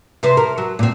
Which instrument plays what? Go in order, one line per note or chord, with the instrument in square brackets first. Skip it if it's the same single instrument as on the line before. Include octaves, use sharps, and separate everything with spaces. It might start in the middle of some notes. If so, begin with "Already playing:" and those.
[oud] C3 B4 C5
A#4
F#3
A#2 C4